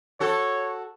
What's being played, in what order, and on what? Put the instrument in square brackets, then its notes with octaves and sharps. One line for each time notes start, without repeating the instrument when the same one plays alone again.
[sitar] F#4 A4 [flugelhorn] C#5